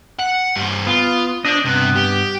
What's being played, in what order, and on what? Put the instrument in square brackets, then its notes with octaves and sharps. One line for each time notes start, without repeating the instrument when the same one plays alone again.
[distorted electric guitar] F#5
G2 C5
[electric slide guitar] B3 [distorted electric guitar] F4
[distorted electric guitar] D4 [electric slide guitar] C5 D#5
[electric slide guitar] G2 B3 [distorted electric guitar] C3
[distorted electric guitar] G4